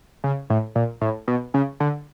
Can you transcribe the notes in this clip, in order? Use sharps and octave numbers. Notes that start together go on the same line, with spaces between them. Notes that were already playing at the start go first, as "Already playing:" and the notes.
C#3
A2
A#2
A2
B2
C#3
D3